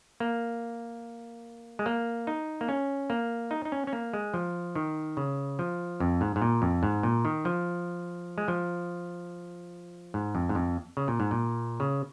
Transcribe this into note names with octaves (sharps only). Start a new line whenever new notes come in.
A#3
G#3
A#3
D#4
A#3
C#4
A#3
D#4
D#4
C#4
C#4
A#3
G#3
F3
D#3
C#3
F3
F2
G#2
G#2
A#2
F2
G#2
A#2
D#3
F3
G#3
F3
G#2
F2
G#2
F2
C#3
A#2
G#2
A#2
C#3